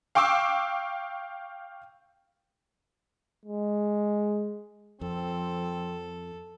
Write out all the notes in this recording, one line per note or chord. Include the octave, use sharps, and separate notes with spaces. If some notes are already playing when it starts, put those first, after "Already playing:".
F5 G5 C#6 D6 E6
G#3
F2 F3 C4 A4